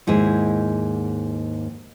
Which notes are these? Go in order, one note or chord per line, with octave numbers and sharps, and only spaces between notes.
D#2 G#2 E4 G#4